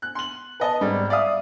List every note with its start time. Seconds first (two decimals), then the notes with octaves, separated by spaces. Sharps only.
0.02 F#6
0.15 C6 F#7
0.60 B4 D#5 A5
0.81 G#1 G3
1.10 D5 E5 F5 D#6